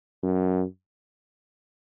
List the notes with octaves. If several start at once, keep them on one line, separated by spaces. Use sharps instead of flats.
F#2